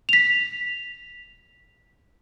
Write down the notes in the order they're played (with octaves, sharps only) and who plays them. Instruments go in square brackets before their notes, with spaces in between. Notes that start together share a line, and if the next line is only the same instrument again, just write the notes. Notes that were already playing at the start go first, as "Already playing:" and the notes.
[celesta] B6 F7